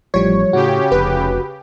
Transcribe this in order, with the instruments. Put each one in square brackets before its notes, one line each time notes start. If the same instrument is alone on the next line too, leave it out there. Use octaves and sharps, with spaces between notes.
[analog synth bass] A1 [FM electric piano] F3 G3 [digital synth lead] C#5
[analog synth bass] A2 [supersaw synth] C#3 G4 [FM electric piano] F#4
[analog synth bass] F1 [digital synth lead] B4